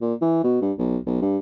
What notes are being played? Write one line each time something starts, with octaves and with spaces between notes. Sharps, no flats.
A#2
E3
B2
G2
B1
B1
G2